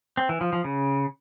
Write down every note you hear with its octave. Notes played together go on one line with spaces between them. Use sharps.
C4
E3
F3
F3
C#3